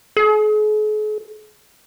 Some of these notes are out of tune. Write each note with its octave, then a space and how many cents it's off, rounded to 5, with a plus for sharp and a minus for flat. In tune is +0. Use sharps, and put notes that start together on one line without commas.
G#4 +45